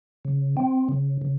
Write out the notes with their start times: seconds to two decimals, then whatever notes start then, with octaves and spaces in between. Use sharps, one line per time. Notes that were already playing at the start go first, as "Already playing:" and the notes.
0.25 C#3
0.57 C4
0.89 C#3
1.22 C#3